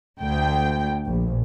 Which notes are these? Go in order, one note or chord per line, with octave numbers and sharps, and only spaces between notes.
D2 G5
A#1